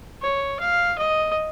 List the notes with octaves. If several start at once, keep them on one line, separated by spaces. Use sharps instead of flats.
C#5
F5
D#5